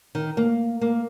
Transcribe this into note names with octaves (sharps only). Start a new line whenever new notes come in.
D#3
A#3
A#3